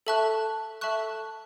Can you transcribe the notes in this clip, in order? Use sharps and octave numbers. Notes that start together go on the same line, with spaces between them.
A4 E5 A5 C#6 F#6
A4 E5 A5 C#6 F#6